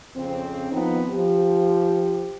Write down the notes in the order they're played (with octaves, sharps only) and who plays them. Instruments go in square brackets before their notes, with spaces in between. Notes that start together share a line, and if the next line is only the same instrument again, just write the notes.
[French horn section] F2 C#3 C4
D#3 F3 B3 C4 D#4
F3 G4